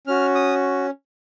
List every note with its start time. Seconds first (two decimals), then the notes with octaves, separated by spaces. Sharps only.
0.07 C#4 F#4 F6
0.35 D#6